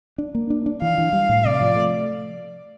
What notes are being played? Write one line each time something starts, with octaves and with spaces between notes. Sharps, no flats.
D4
A#3
D4
D4
E3 F5
E3
G3
A2
C3 D5
F3
A3